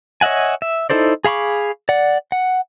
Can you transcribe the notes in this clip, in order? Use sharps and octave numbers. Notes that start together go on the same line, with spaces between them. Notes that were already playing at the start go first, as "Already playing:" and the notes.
C#5 D#5 E5 F#5 G#5
E5
D#4 E4 A4 C5 D5
G#4 F5 B5 C#6 D6
D5 F#5
F#5